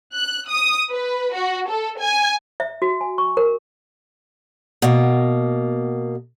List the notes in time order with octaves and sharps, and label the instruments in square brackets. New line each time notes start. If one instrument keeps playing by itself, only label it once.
[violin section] F#6
D#6
B4
F#4
A4
G#5
[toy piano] E5
F#4
G#5
C#6
A#4
[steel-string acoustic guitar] B2 A#3